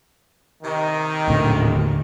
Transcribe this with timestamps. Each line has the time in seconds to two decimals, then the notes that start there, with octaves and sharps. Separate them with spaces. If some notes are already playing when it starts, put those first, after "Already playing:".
0.63 C3 D#3
1.28 D#1 A2 D3